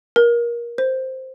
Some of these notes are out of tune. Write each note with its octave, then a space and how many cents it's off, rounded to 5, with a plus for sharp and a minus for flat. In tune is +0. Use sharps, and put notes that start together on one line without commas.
A#4 +20
C5 +0